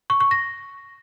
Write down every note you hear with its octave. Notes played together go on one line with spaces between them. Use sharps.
C#6
C#6
A#6